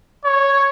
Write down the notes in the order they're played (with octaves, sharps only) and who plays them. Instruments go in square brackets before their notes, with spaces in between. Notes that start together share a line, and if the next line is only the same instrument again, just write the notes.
[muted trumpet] C#5